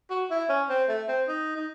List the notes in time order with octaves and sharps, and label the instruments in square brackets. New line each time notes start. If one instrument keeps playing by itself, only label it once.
[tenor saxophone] F#4
E4
C#4
C4
A3
C4
D#4
D#4